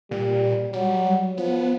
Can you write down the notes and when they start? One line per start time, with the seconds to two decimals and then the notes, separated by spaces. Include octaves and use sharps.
0.11 A#2 G3
0.73 F#3 G3
1.38 F3 B3